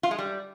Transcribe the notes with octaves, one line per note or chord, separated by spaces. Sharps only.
F4
G#3
G3